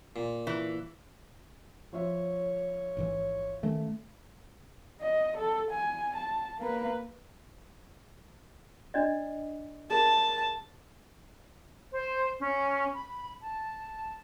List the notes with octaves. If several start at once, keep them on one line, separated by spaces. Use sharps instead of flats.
A#2
E3
F3 F4 C#5 E5
A1 G#2 E3
D#3 A3 C#4
D#5
A4
G#5
A5
A#3 B4
D4 D5 D#5
G#4 A#4 A5
C5
C#4
B5
A5